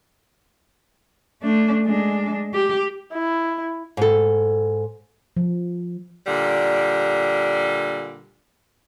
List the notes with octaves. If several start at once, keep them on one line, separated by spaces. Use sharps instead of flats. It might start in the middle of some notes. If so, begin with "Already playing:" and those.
A3 D4
G#3 D4
G4
E4
G#2 A4
F3
A#2 D3 G3